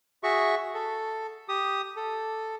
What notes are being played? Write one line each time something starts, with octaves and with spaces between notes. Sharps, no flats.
F#4 G#4 E5 C#6
A4
G4 D#6
A4